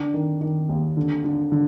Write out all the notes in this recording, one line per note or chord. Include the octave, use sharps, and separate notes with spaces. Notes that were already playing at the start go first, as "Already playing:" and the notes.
Already playing: D3 D4
D#3
D#3
D#2
D3
D3
D3